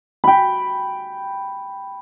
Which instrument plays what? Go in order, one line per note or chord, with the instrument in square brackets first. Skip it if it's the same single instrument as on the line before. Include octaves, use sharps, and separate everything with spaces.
[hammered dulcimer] G5 B5